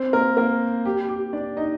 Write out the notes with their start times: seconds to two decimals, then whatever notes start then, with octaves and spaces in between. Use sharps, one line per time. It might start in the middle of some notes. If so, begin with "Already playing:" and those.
Already playing: C4 C5
0.13 A#3 A#4
0.37 A#3 A#4
0.85 G4
1.08 G4
1.33 D4 D5
1.57 D#4 D#5